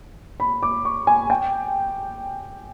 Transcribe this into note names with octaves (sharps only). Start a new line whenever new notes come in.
B5
D6
C#6
G#5
G5